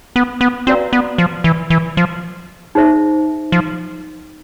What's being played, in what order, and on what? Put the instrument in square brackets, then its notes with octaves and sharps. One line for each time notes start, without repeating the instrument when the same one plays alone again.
[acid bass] B3
B3
[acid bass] C4 [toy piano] F#4 B4 D5 F5 A#5
[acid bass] B3
F3
E3
E3
F3
[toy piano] D#4 G#4 C5 E5
[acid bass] F3